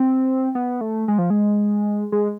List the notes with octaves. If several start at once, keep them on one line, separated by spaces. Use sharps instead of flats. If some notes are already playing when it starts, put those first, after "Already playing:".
Already playing: C4
B3
A3
G#3
F3
G#3
G#3